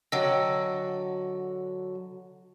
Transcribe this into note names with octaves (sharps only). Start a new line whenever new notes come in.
D3 F#3 D#5 G5 E6